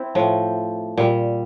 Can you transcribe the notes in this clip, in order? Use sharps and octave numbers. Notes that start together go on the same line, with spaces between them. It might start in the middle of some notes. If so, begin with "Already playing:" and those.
Already playing: C4 E4
A2 F3
A#2 G3